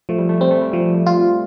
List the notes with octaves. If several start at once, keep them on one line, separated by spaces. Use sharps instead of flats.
F3 A3
G3
A3
G3 C4
A3
G3
F3
A3
F4
C4